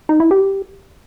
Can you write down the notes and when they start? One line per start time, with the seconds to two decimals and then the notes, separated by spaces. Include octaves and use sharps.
0.09 D#4
0.20 E4
0.31 G4